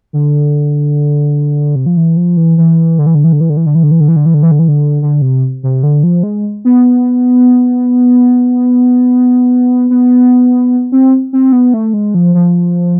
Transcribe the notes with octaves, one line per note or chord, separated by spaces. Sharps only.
D3
C3
F3
E3
F3
E3
E3
D3
E3
D3
E3
D3
E3
D3
E3
D3
E3
D3
E3
D3
E3
D3
E3
D3
E3
D3
E3
D3
D3
C3
C3
D3
F3
G#3
B3
B3
C4
C4
B3
A3
G#3
F3
F3